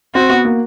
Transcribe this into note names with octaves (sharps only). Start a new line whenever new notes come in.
C4 F#4
B3
A#3